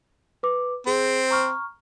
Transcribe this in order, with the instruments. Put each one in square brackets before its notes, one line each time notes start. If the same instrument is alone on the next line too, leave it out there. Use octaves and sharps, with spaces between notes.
[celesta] B4 D6
[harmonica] C4 [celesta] G#4
[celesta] A#5 C#6 F6